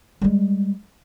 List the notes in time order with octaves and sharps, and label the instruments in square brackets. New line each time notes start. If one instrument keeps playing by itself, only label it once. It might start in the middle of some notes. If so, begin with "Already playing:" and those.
[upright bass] G3 G#3